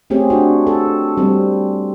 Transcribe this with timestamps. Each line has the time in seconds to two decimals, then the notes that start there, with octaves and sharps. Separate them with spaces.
0.10 A3 C4 C#4 G4 G#4
0.30 D4 F#4
0.67 A4
1.17 G3 C4